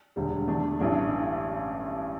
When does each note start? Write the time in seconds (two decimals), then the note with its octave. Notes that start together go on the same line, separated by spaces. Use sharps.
0.16 E1 D2 D3 G3
0.47 E2 B2 A3 D4
0.80 A1 G2 E3 A3 D4